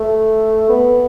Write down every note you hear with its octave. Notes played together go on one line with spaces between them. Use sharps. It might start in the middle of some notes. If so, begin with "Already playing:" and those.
Already playing: A3
B3